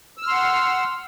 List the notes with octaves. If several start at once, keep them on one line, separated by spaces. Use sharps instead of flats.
F#5 C6 E6 F6